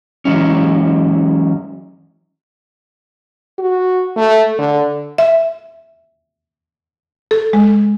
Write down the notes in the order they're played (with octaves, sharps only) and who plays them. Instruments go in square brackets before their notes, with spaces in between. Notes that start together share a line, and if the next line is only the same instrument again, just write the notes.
[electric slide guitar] E3 F#3 G#3 C#4
[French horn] F#4
A3
D3
[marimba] E5
A4
G#3